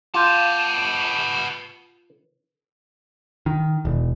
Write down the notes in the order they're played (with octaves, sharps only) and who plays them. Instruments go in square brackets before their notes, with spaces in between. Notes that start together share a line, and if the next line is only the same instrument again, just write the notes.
[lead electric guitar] B3 A5 [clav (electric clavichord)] F4 [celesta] D6 G6 D#7
[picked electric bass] D#3
E1